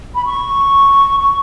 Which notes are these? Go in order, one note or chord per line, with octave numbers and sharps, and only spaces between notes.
B5
C#6
C#6